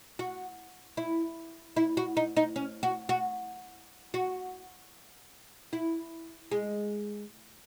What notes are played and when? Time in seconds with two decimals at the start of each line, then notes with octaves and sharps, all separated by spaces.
0.19 F#4
0.97 E4
1.76 E4
1.97 F#4
2.17 D#4
2.36 D#4
2.56 C#4
2.83 F#4
3.09 F#4
4.14 F#4
5.73 E4
6.52 G#3